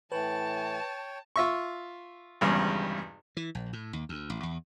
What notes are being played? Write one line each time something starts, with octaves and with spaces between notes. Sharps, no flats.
A2 E3 B4 C#5 G5 A5
F4 E5 C#6
G#1 E2 G2 C#3
E3
A#1
A2
D#2
D2
A1
E2